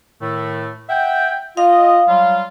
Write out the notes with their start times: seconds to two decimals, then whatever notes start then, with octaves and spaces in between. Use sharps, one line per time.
0.21 A2 D#3 A3
0.89 E5 F#5 G5
1.57 F4 D#5 F5
2.08 F#3 G3 F4